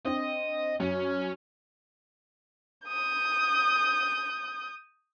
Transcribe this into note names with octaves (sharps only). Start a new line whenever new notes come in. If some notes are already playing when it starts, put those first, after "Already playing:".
C4 D4 D#5
F#2 C#4
D#6 G6